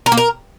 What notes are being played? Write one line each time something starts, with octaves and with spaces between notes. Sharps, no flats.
A#4
A#3
A#4